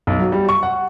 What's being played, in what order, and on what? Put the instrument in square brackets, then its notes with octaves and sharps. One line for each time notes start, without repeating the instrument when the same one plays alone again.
[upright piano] B1
F#3
G3
C#6
F#5